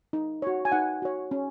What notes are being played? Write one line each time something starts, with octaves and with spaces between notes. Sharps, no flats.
D#4
F#4 C#5
G#5
D#4 F#5
F#4 C#5
C#4